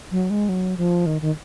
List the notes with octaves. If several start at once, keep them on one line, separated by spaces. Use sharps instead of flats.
F#3
G#3
F#3
F3
D#3
D#3